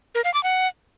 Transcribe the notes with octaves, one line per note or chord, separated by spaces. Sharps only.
A#4
F5
D6
F#5